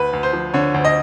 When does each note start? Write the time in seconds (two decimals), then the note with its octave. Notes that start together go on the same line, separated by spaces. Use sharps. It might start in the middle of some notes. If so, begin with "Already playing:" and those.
Already playing: D2 B4
0.13 D2
0.23 C5
0.33 F3
0.54 D3 C#5
0.74 D2
0.85 D#5